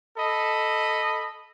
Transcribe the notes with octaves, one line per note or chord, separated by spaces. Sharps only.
A4 D#5 B5